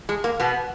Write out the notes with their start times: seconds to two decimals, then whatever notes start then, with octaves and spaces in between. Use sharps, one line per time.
0.09 G#3
0.24 A#3
0.40 B2 B3